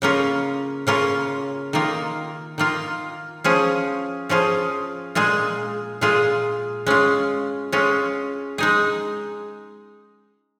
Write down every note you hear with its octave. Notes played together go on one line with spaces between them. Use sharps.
C#3 A#3 C#4 F4
C#3 A#3 C#4 F4
D#3 A#3 F4
D#3 A#3 F4
F3 C#4 F4 G#4
F3 C#4 F4 G#4
A#2 G#3 F4 G#4
A#2 G#3 F4 G#4
G#3 C#4 F4
G#3 C#4 F4
G#3 D#4 G#4